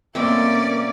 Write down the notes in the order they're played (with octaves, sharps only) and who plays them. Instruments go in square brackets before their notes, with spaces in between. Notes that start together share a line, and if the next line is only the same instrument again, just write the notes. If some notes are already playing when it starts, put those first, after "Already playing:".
[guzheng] B2 A3 [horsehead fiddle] A#3 [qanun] C4 [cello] C#4 D5